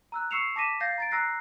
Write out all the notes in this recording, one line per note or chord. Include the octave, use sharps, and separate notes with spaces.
A#5 E6 F#6
C#6 E6 C7 C#7 E7 F7
A5 D6 A#6 B6 D#7 E7
F5 G6 A6 A#6 C7
A#5 A6 D7
A#5 E6 F#6 A#6 C7